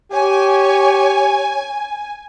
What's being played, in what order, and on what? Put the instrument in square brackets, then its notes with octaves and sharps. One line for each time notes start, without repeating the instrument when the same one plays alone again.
[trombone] G4 [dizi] C#5 [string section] G#5